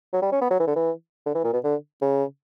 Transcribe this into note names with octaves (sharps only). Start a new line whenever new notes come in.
F#3
G3
C#4
B3
F#3
E3
D3
E3
D3
E3
A#2
B2
D3
C#3